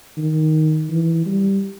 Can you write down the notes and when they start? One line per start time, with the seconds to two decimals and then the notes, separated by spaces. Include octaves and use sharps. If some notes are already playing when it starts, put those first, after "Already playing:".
0.18 D#3
0.90 E3
1.26 G3